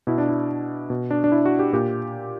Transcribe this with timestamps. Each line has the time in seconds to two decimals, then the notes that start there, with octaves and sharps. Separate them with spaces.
0.07 B2 E4
0.18 D4
0.29 E4
0.90 B2
1.11 D4
1.24 D4
1.32 E4
1.46 F#4
1.59 G4
1.73 A#2 G4